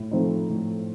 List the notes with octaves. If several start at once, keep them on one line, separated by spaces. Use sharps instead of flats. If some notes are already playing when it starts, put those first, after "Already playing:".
Already playing: A2
F3 A3 C4 D#4
A2